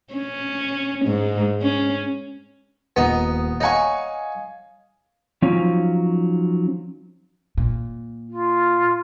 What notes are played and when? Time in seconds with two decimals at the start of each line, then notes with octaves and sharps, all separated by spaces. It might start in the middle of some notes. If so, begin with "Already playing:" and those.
0.14 C#4
1.06 G#2
1.61 C#4
2.96 D#1 B3 D#4
3.60 D#4 C#5 F5 F#5 G#5 C#6
5.42 F3 F#3 C#4 D#4
7.57 A#2
8.29 F4